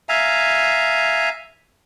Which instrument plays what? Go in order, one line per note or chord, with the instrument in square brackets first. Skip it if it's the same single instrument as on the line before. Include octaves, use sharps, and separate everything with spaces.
[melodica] E5 F5 G#5 A#5